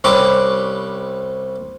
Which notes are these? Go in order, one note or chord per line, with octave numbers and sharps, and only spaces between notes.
C2 G3 C4 C#4 B4 D6